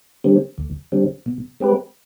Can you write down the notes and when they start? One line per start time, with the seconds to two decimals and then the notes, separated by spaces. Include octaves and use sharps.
0.24 D3 G3 C4
0.58 D2
0.92 D3 G3 C4
1.26 B2
1.60 G#3 C4 G4 B4